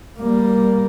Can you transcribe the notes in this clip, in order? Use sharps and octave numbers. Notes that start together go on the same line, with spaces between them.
G3 A#3